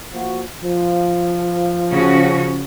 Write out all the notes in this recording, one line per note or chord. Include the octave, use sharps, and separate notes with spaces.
F3 A#3 F#4
F3
C#3 C#4 F#4